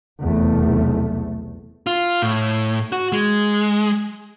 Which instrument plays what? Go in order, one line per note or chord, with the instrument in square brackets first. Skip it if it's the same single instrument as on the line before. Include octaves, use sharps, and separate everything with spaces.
[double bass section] F1 B1 E2 A3
[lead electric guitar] F4
A2
F#4
G#3